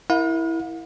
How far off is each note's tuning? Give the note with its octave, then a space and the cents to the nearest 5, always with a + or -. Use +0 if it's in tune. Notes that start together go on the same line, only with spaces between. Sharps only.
E4 -5 A#4 +0 F5 +45